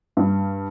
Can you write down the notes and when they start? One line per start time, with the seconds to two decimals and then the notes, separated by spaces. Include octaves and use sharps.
0.17 G2